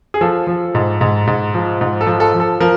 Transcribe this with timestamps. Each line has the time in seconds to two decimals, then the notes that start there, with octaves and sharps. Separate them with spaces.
0.14 G#4
0.21 F3 A4
0.47 F3
0.75 G#2
1.01 G#2
1.27 G#2
1.54 F3
1.81 G#2
2.01 A4
2.07 F3
2.20 A4
2.34 F3
2.40 A4
2.60 F3 A#4